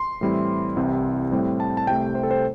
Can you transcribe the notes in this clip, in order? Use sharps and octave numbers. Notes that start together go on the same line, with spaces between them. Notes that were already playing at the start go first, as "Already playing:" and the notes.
Already playing: C6
A2 E3 G3 C4 E4
C2 C3 E3 C4
A2 G3 C4
A5
A5
C2 C3 A3 G5
C5
A4
C5